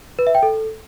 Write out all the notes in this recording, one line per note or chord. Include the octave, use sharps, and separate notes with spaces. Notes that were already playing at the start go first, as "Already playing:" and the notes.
B4
E5
G5
A4